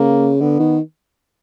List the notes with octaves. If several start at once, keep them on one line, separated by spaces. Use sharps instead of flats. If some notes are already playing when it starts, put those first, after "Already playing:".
Already playing: C#3 A#3
D3 B3
D#3